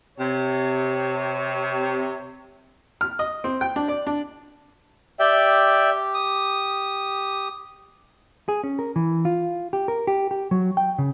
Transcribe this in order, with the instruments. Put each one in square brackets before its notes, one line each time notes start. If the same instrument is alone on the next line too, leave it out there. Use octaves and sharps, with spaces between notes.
[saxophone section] C3 C#5
[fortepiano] F6
D#5
C4
G5
D4
D5
D4
[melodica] G4 [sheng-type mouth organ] D5 E5 G5
[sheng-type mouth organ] D#6
[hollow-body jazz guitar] G#4
C#4
A#4
E3
F4
G4
A#4
G4
G4
F#3
G5
C#3